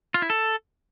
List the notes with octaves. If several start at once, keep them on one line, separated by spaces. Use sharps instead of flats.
F4
E4
A4